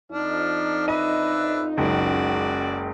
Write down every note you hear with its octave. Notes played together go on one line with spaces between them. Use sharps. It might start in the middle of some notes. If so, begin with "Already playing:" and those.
F2 F3 D4 D#4 F6
D4 B4 D#5 E5 D#7
F#1 C#2 F#4 D5